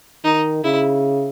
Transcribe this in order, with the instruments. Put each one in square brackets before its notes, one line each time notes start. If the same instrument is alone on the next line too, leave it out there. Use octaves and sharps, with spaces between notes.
[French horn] D#3 [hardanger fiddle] D#4
[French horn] C#3 [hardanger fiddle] E4